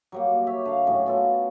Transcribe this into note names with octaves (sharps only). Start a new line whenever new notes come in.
F#3 G3 A#3
G4 C#5 E5
D3 F5
A2 F#3 C#4
B3 F4 A4